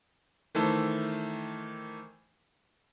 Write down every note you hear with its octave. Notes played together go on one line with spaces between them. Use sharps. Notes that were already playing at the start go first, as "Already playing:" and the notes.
D#3 E3 A3 A4 C5